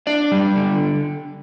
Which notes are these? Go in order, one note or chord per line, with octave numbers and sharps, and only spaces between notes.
D4 D5
G3
D3